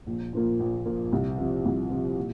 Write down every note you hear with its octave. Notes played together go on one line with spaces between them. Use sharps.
A#1
A#2 F3 A#3
A#1
A#2 F3 A#3
C2
C3 F3
C2
C3 F3
A#2